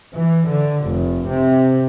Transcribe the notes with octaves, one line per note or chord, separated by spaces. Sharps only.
E3
D3
F1
C3